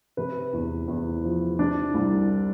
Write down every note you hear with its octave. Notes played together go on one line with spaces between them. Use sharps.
C3 B4
E2
E2
F3
C3 D4
C2